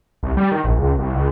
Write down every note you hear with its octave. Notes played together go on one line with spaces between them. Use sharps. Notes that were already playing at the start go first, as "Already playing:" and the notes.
C2
G3
D#3
A#1
C#2
C2
C#2